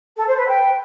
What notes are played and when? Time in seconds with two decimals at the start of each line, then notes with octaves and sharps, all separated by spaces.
0.16 A4
0.27 C5
0.37 B4
0.47 G5